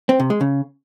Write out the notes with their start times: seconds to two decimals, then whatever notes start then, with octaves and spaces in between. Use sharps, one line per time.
0.09 C4
0.20 C3
0.30 G#3
0.41 C#3